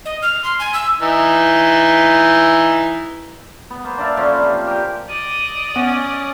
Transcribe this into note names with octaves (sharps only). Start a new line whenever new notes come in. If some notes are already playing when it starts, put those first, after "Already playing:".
D#5
F6
C6
G#5
E6
E3 D#4
B3
A#3 B3 C5
D4 D5 E5 F5
D3 F3 C#4 C5
C3 F3
G4 A#4 G#5
D5 D#5 D#6 D#7
B3 C#4